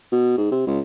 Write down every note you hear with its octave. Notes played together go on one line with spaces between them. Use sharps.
B2
G#2
C3
C#2